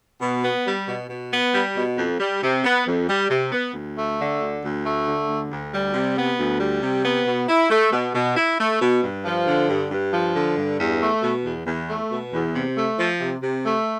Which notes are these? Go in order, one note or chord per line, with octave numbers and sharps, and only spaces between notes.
B2
B3
G3
B2
B2
B3
G3
B2
F2
G3
C3
B3
F2
G3
C3
B3
D2
A3
D3
D2
D2
A3
D3
D2
D2
G3
C3
B3
D2
G3
C3
B3
B2
E4
A3
B2
B2
E4
A3
B2
G2
F3
D3
G2
G2
F3
D3
G2
E2
A3
B2
E2
E2
A3
B2
E2
C3
A3
F3
C3
C3
A3